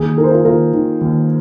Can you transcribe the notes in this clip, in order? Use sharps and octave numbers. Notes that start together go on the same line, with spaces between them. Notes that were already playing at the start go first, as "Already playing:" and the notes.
Already playing: D#2 G#4
D#3 A#4
C5
F4 A#4
D#2 F4 A#4
D#3
D#2